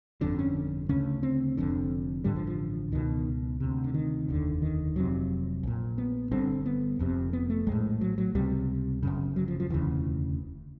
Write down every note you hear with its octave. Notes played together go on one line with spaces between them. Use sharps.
G1 F2 D3 D4
C#4
D2 C#3 C#4
C4
F1 F2 D3
A1 G2 D3 G3
F3
F3
C#2 B2 D#3
D2 C3
D3
D#3
F1 D#2 D3
D#3
F1 F2 C3 F#3
A#1 A#2
B3
G1 G2 D3 C4
B3
F1 F2 C3
B3
A3
A#1 A2 G#3
F#3
F#3
C#2 C3 G3
G1 F#2 C#3
F#3
F3
F3
E1 D2 C#3 E3